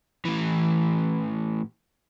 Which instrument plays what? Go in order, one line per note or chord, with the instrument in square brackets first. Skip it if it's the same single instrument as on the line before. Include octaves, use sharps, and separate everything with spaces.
[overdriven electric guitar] A2 E3